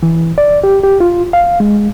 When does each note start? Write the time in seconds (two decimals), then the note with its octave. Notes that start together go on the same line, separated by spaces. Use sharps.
0.03 E3
0.38 D5
0.64 G4
0.84 G4
1.00 F4
1.33 F5
1.60 G#3